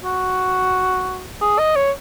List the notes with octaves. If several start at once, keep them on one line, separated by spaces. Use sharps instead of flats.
F#4
G#4
D#5
C#5